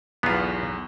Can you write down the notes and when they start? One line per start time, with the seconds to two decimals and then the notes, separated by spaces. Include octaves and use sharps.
0.23 B1 E2 B3 F4